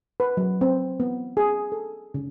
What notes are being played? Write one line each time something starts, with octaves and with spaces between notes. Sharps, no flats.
B4
F#3
C4
B3
G#4
A4
C#3